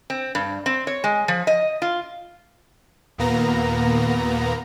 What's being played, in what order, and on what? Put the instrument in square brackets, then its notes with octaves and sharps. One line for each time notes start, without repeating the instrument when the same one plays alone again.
[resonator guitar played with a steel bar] C4
G2
C4
C#5
G#3
F3
D#5
F4
[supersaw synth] D#2 A#2 A#3 B3 A#5 A#6